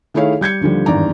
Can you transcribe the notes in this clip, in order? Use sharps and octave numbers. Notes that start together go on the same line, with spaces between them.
D#3 A3 E4 G#4 C#5 F5
G3 G6 G#6 C#7
D#2 D3 F3 G3
G#1 E2 G2 D5 A#5